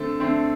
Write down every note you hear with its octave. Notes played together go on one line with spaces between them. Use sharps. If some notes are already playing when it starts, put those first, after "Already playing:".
Already playing: D3 A3 C4 A4
D3 A3 C4